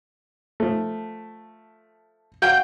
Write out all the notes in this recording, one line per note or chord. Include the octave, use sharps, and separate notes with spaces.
F3 A3
F#4 F5 G5 G6